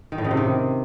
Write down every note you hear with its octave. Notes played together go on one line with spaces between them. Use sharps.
D#3
A2
C#3
C3
D#3